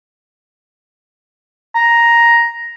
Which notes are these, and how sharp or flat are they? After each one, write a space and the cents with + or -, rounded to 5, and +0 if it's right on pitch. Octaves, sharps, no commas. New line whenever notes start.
A#5 +5